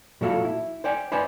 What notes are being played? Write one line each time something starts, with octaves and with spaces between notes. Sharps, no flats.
A#2 F#3 E4 F#4 A4 F5
E4
C5 D5 G5 G#5
B4 C5 D5 D#5 G#5